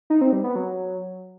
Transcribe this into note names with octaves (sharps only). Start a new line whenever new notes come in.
D#4
C4
G3
B3
F#3